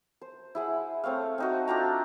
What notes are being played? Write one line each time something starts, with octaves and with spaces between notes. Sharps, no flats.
C5
E4 G#4 F#5
A3 C4 C#5 F5
C4 D#4 F#4
D4 F4 G5 A#5